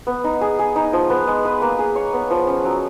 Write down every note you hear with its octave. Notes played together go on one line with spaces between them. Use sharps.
B3
D#4
G#4
G#4
D#4
F3
B3
G#3
B4
A#3
G#4
C#5
B3
F3
C#4
F#3